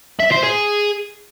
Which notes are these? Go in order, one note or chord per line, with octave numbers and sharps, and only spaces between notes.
E5
C5
G#4